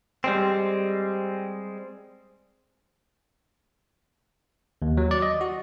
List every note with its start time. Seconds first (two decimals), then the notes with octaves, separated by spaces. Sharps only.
0.24 G3 G#3 C4
4.82 D#2
4.97 F#3
5.11 D5
5.22 D#5
5.41 F#4